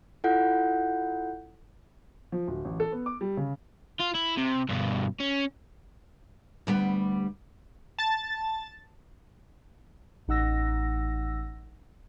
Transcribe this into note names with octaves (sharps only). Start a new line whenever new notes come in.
E4 F4 A4 F#5 G6
F3
D1
A1
A4
B3
D6
G3
C#3
F4
E4
C3
G2 B2
C#4
D2 G3 B3
A5 A6
A1 D#4 F#5 E6 A#6